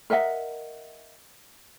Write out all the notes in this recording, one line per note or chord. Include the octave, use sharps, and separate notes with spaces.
A#4 D#5 E5 F#5